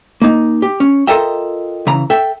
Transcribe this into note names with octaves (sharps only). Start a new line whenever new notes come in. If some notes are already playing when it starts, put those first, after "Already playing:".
A#3 D#4
G4
C#4
F4 A4 A#4 D#5 E5 G5
C#3 E3 A#5
A4 E5 G5